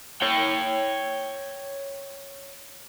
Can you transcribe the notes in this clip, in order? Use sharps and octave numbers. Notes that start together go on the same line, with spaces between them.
C#5 G5